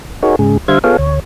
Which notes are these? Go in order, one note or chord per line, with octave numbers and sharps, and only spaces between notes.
D#4 F#4 G#4 A#4 C#5
G#2 C#3 G#4
D3 G3 C5 E5 F5 G#6
B3 F4 G#4 A4 C#5 F5
D2 C#5